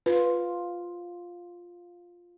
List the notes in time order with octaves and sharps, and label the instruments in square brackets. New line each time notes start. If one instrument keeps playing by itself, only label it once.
[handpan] F4 [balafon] B4